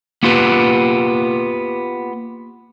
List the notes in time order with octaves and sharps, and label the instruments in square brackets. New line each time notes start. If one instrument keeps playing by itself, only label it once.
[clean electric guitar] A#3 B3 F4 G4 B4